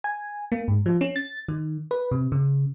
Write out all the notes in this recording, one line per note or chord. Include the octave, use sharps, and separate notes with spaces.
G#5
A#3
G#2
F3
C#4
A6
D#3
B4
C3
C#3